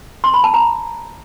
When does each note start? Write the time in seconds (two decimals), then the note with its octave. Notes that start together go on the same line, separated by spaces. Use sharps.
0.24 C6
0.34 B5
0.44 A5
0.54 A#5